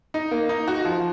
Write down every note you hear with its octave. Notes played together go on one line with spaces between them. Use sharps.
D#4
A#3
D#4
F#4
F3